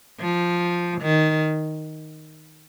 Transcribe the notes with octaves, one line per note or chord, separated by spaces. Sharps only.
F3
D#3